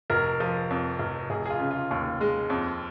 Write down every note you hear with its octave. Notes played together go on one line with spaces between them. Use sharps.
F1 A#4
F3
F2
F1
F1 G#4
G#4
F4
C#3
F4
D#2
G#3
F2